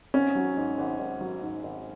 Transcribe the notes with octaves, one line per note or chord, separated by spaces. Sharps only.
G#1 C#4
F#3
G#2
G#1
G#1
F#3
G#2
G#1